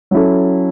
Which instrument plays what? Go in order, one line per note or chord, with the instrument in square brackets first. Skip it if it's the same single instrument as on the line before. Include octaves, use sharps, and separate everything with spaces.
[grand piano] F#3 C#4 E4 A4